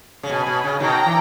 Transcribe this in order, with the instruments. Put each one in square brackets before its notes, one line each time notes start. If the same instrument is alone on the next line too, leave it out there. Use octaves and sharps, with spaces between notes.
[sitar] C#3
[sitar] B2 [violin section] G#5 B5
[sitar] B2
C#3
[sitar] B2 D#3 [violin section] G5 A#5
[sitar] E3